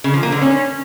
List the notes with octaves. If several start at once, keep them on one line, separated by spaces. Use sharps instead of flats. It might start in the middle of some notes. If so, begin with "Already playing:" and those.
C#3
F3
A#3
D3
C#4